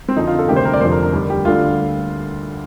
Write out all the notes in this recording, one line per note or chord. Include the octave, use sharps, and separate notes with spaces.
C4
F2 D3 F3 D#4
F4
A4
D2 C3 D#3 G3 G4
C5
A#4
D5
F1 F2 D3 F3 C5
A#4
A#4
D#2 D3 G3
G4
D2 D3 G3 F4